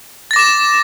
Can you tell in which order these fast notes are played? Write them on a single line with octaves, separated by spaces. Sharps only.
A6 A#6 D6 E7